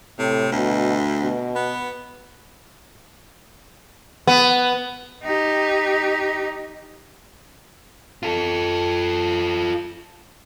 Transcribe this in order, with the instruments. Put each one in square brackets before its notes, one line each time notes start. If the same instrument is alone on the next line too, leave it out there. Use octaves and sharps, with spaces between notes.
[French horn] A2 [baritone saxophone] C3
[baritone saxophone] D2 [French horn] B2
[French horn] B2
[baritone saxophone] B3
[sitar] B3
[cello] D#4 G4
[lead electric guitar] F4 A4